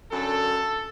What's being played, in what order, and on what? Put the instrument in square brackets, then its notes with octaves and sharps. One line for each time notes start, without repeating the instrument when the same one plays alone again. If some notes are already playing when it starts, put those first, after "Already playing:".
[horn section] F#2 D3 F#3 A4